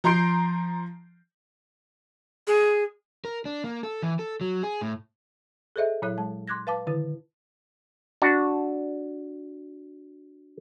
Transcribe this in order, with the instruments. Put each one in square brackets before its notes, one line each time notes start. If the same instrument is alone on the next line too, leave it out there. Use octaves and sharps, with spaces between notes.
[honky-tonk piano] F3 A#5 C6 G6 C7 D7
[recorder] G#4
[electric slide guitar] A#4
D4
A#3
A4
E3
A4
F#3
G#4
A2
[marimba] G#4 A4 C5 D#5 E5
A#2 F#3 E4 C#5 F#6
G#3 A5
C6 D6 F#6 G#6 A#6
B4 F5 A5 D6
D3 D#3 E4 B4
[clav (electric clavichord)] D4 F#4